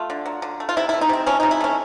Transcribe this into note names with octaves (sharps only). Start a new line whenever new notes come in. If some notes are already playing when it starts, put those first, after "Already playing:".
Already playing: A3 F4
D3
F#3
D3
A3
F4
C3 E4
A3 E4
D#4
C3 C4
F3 C#4
C3 D#4
E4
A3 C#4